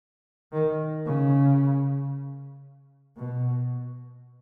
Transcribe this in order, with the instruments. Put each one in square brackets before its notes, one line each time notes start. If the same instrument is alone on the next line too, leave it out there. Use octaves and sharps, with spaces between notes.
[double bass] D#3
C#3
B2